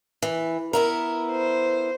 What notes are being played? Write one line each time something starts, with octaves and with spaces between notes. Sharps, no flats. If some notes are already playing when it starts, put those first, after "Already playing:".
E3
B3 E4 A#4
C5